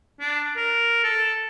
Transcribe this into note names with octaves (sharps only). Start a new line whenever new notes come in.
D4
A#4
A4